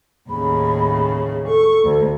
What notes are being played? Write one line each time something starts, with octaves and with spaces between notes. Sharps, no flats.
D#2 A2 C#3 B5
A4 C#6
D2